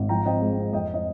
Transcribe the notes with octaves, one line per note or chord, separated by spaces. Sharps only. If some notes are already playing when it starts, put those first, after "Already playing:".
Already playing: G#1
F3 G5 A#5
C4 D#5 G5
G#3
C4
F2 D#5 G5
D#5